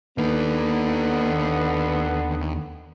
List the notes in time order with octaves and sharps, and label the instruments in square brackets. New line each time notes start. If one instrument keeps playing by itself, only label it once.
[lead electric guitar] D#2 A#3 [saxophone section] D3 B3